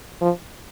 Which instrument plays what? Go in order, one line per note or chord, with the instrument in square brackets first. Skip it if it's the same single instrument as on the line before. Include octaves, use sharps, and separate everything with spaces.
[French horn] F3